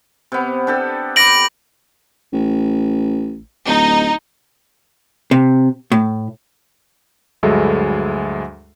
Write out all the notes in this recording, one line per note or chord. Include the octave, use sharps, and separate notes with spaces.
C3 B3
D4 G4 A4
B5 D6 A#6 D7 F#7
A1
D1 D#4
C3
A2
D2 G2 F#3 G#3 A4 E5